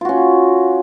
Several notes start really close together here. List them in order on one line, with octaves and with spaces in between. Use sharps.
F4 F#4 C#4